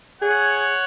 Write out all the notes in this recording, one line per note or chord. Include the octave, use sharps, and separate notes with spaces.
G#4 C#5 F#5